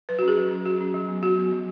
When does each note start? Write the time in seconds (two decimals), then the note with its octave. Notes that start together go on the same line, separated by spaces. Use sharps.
0.09 F#3 B4
0.19 F#4
0.22 C#4
0.28 G#4
0.37 F#3
0.51 C#4
0.65 F#3 F#4
0.80 C#4
0.94 F#3
1.09 B3
1.22 F#3 F#4
1.37 B3
1.52 F#3